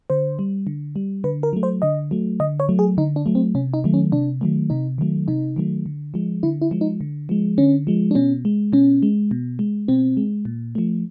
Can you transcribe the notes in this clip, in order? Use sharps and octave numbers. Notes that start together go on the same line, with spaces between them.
D3 C5
G3
D3
G3
D3 B4
A#4
F#3 A3
C5
D3 D#5
F#3 A3
D3 D#5
C#5
F#3 A3
G#4
D3 D#4
D4
F#3 A3
C4
C3 C#4
D#4
D#3 F#3 A3
C#4
C3 D4
D#3 F#3 A3
C3 D#4
D#3 F#3 A3
C3 D#4
D#3 F#3 A3
D3
F3 G#3
D3 E4
E4
F3 G#3
D#4
D3
F3 G#3
D3 C#4
F3 G#3
D4
B2 C#4
G#3
B2 C#4
G#3
B2
G#3
B2 C4
G#3
A#2
F3 A3